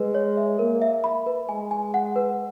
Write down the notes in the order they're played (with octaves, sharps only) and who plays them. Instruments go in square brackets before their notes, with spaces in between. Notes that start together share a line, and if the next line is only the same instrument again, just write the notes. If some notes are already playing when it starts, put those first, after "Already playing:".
Already playing: [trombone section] G#3 [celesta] B4
[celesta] C#5
E5
[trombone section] A#3 [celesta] A#4
[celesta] E5
B5
B4
[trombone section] G#3 [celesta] G#5
[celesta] G#5
F#5
B4